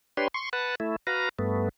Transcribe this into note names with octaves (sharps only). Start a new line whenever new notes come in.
D4 G4 B4 C#5 C6
C6 C#6
B4 F#5 A5
A3 E4
F#4 B4 F5 A#5
G2 A3 B3